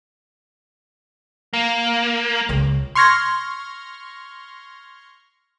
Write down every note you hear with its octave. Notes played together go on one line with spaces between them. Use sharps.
A#3
C#2
C6 C#6 F6 G#6 A#6